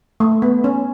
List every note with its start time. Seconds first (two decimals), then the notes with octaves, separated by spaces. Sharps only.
0.20 A3
0.42 B3
0.64 C#4